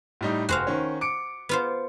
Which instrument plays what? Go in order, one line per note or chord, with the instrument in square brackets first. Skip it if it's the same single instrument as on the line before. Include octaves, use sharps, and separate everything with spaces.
[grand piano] A2 G3 D#4
[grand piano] F1 [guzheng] F#4 C5 F5
[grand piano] D#3 C#4
D6 C#7 D7
[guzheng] B3 F4 C5